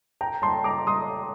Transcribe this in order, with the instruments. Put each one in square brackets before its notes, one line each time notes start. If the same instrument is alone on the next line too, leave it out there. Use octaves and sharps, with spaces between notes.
[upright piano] G5 A#5
A5 C6
A#5 D6
C6 D#6